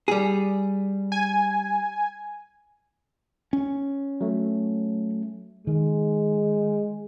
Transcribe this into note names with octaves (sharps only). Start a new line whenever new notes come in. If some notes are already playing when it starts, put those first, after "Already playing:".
G3 G#4
G#5
C#4
F#3 A3
D#3 G#3